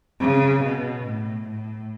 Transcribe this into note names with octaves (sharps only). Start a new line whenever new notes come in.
C#3
B2
A2
A2